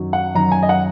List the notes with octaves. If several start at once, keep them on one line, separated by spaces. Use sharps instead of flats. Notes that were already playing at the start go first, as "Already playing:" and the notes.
Already playing: F#2 D#3 F#3
F#5
F#2 D#3 F#3 A#5
G#5
D#5
F#5